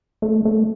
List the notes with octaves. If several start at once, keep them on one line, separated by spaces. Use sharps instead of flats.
A3
A3